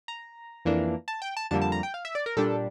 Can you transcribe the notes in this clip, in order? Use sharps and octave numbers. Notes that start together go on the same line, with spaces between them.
A#5
F2 E3 A#3 D4
A5
G5
A5
F2 D3 G3 A#3 A5
A5
A#5
G5
F5
E5
D5
A#4
A#2 G3 D4 A4